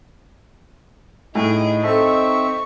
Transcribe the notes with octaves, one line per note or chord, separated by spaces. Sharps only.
A2 D#4 G#4 D#5 D7
C4 A4 E5 C#6